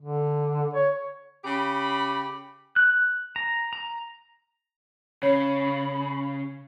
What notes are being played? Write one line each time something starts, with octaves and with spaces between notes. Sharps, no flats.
D3
C#5
C#3 G4 B5
F#6
A#5
A#5
C#3 C#5 B5